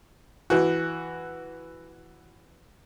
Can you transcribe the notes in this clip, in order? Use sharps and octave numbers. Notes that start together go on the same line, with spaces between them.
E3 F#4